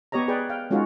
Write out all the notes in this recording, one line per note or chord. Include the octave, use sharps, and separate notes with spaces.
B3 G4 C#5 D#5 A#5
G#4 B4 D5 G5
F5 G5
G#3 C#4 D#4 F4 F#4 A#4